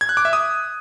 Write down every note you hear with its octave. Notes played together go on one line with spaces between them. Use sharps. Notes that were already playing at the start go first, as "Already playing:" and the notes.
G#6
F#6
D6
E5
D#6